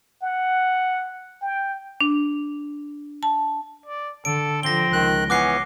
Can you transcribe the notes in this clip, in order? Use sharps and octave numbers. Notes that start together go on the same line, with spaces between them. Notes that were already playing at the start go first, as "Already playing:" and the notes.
F#5
G5
D4
A5
D5
D3 A4 D7
D3 F3 C4 A#6 G7
C#2 D#3 F#6
E3 B3 C#4 D6 F#6 C7